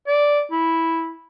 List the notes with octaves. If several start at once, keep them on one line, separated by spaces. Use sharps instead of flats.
D5
E4